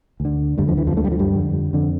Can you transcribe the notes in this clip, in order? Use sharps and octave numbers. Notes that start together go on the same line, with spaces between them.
D2
D3
D2 G2 D3 G3
F2 F3
E3
F2 F3
D2 D3 A3
G3
F3
G2 G3
F2 D3
F2 D3